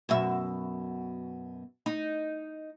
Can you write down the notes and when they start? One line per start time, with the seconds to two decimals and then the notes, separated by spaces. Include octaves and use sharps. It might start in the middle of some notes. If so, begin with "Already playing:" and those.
0.09 F#2 B2 E5
1.86 D#4